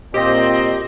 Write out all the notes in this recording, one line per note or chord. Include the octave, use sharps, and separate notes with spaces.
A#2 C4 G4 D#5